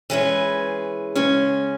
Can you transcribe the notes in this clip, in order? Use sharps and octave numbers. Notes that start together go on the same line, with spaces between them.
E3 G#3 C#4 G#4 B4
C#3 G#3 C#4